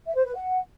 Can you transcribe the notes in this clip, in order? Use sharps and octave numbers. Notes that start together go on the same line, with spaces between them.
E5
C5
B4
F#5